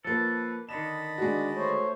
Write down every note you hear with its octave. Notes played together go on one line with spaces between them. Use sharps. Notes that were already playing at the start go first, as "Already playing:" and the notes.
F3 A#3 A4 B4
D3 D#3 D#5 A5 B5 E7
G#3 D4 F#4
A3 C5 C#5